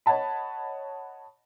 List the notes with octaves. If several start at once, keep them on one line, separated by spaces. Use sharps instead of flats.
C#5 D#5 F#5 A5 B5